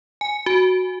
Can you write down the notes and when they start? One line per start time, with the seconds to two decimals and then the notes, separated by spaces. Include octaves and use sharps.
0.21 G#5
0.46 F#4